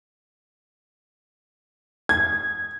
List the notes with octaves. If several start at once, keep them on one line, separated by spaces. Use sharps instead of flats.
G#6